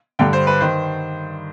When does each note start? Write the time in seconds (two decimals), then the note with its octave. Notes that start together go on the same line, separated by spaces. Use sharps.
0.19 G2 D3 G5
0.33 C5
0.47 B4
0.61 D#3 C5